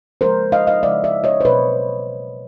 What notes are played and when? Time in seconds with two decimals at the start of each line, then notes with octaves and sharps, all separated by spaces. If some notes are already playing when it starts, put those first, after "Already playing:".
0.21 C#3 F3 G#3 A#4 C5
0.52 D#5 F5
0.67 D#5 F5
0.83 C#3 F3 G#3 D5 E5
1.04 D5 E5
1.24 C#5 D#5
1.41 C5
1.45 B2 F#3 A#3 B4 C#5